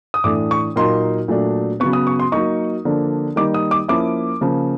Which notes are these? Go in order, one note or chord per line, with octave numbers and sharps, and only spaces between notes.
D#6
A2 E3 A3 D4 D6
C#6
A#2 F#3 A#3 D#4 C6
A#2 F#3 A3 D4
C#3 F#3 B3 C#6
D#6
C#6
C6
F#3 A#3 D#4 C#6
D3 F3 A#3 D4
D#3 G3 A#3 D#4 D6
D#6
D6
F3 A#3 C#4 E4 D6
C#3 F3 A#3